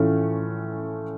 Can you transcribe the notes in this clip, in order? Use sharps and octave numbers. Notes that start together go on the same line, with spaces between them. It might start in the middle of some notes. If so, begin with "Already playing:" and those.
Already playing: A2 E3 A3 C#4 F4